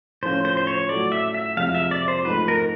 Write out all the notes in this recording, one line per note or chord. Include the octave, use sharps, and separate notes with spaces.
A2 F3 A3 C#4 F4 C5
C5
C5
C#5
A2 F#3 A3 D5
E5
E5
F2 C3 F3 G#3 F5
E5
D5
C5
G#2 F3 A3 B4
A#4